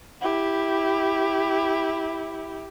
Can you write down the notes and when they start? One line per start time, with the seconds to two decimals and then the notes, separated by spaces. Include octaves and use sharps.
0.22 E4 G4